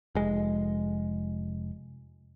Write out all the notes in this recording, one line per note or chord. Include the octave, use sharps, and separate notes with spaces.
F1 G#3